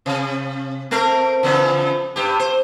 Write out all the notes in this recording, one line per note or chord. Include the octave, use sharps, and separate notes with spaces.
C3
A3 C4 A#4
C#3 E3 F3
G2 G4
C5